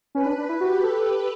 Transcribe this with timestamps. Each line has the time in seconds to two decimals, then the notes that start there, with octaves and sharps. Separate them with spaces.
0.14 C#4 B4
0.26 D4
0.38 D4
0.49 E4
0.61 F#4 G4
0.84 A4